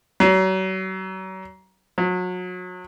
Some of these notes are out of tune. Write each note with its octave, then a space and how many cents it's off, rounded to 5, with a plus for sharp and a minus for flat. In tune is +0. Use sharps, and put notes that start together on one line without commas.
F#3 +35
F#3 -30